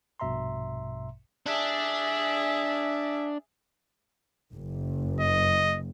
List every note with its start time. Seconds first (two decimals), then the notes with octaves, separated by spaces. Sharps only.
0.20 A#1 G2 B2 E5 A#5 C6
1.46 D4 G#4 E5
4.53 F#1
5.21 D#5